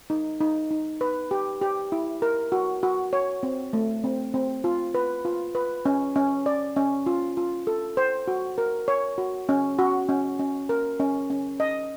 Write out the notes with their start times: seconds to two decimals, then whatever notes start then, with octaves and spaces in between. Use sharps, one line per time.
0.10 D#4
0.41 D#4
0.71 D#4
1.01 B4
1.31 G4
1.62 G4
1.92 E4
2.22 A#4
2.52 F#4
2.83 F#4
3.13 C#5
3.43 C4
3.73 A3
4.04 C4
4.34 C4
4.64 F4
4.95 B4
5.25 F4
5.55 B4
5.85 C#4
6.16 C#4
6.46 D5
6.76 C#4
7.06 F4
7.37 F4
7.67 A4
7.97 C5
8.28 F#4
8.58 A#4
8.88 C#5
9.18 F#4
9.49 C#4
9.79 F#4
10.09 C#4
10.39 C#4
10.69 A#4
11.00 C#4
11.30 C#4
11.60 D#5